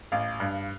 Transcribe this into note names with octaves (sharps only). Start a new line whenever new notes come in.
A1 F5
G2